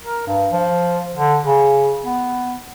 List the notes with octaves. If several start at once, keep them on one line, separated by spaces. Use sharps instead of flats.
A#4
G2
F3
D3
C#3
B3